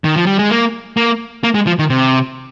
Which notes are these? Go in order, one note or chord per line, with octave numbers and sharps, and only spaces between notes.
D#3
F3
G3
G#3
A#3
A#3
A#3
G#3
F3
D#3
C3